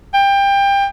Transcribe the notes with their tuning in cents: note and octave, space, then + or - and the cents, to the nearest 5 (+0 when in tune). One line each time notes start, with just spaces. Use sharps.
G5 +25